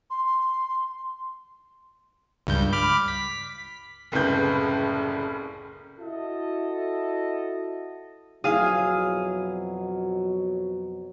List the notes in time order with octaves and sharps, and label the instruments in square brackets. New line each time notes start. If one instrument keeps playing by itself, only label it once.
[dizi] C6
[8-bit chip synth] C#2 G2 G6
B5 D6 F6
B6
[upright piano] F#1 C2 A2 C#3 B4 G6
[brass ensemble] E4 F#4 A4 D#5
[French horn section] F2 B2 F#3 [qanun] E4 G#4 [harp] F5 D#6